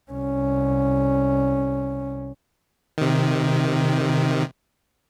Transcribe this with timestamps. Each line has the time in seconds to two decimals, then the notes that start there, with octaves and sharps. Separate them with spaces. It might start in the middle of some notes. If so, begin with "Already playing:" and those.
0.11 C2 C#4
2.98 C3 D#3